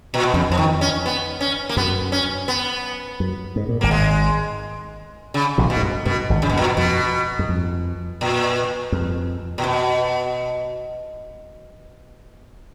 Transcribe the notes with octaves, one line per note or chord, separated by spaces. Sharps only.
A#2
B2
F2 C#3
F2 F3
D#3
C#4
B3
C#4
A#3
F#2 B3
C#4
B3
F#2
G#2
A#2
G#1 G#2 A#3
G#3
C#3
A#1 A#2
B2
G#2
F#2
F#2 B2
G#1 G#2
F2 C#3
B2
F#2
A#2
B2
F2 B2
F#2
F2
A#2
F2
A#2
B2